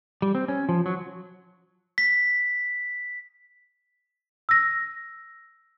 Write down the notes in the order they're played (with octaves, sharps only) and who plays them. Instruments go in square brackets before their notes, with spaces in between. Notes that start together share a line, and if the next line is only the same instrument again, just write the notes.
[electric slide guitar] G3
C4
C#4
F3
F#3
[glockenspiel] B6
[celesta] E6 A#6